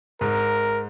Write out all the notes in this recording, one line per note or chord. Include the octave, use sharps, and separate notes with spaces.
G#2 A#4